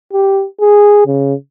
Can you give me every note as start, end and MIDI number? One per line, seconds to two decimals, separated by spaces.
0.13 0.45 67
0.61 1.05 68
1.07 1.34 49